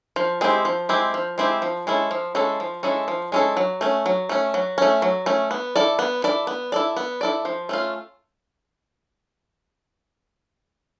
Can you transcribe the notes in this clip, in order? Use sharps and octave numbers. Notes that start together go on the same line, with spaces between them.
F3
G#3 C4 E4 G4
F3
G#3 C4 E4 G4
F3
G#3 C4 E4 G4
F3
G#3 C#4 E4 A4
F3
G#3 C#4 E4 A4
F3
G#3 C#4 E4 A4
F3
G#3 C#4 E4 A4
F#3
A3 C#4
F#3
A3 C#4
F#3
A3 C#4
F#3
A3 C#4
B3
E4 A4 D5
B3
E4 A4 D5
B3
E4 A4 D5
B3
E4 A4 D5
F3
A3 C#4 F4